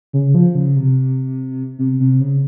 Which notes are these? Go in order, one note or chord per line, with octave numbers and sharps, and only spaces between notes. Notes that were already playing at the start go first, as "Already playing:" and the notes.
C#3
F3
C#3
C3
C3
C3
C#3